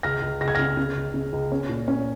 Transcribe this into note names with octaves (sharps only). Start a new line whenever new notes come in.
C#2 F6 A#6
C#2
C#2 A#6
G#6
C#3 F6 A#6
C#3
C#2
C#3
C#2
C#4
A#2
C#4